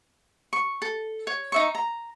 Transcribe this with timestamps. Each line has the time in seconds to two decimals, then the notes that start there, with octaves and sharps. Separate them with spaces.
0.53 C#6
0.82 A4
1.27 C#5
1.52 D#4 E5 C#6
1.75 A#5